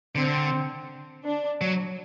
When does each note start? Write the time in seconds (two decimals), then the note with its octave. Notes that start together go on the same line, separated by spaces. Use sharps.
0.15 D3 C4
1.25 D4
1.61 F#3